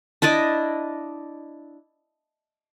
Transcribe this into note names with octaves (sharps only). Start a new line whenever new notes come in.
D4 E4 D5 D#5